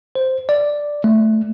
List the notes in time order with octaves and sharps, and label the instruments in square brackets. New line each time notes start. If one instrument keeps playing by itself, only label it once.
[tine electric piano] C5
D5
A3